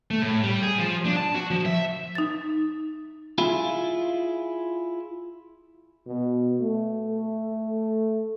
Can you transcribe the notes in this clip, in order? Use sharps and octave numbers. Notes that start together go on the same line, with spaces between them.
A3
A2
G3
G#4
F3
D4
A5
F#4
F3
E5
D#4 A6
E4 F4 G#4
B2
A3